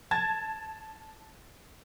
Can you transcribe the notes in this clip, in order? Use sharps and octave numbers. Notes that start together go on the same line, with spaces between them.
A5 G#6 A6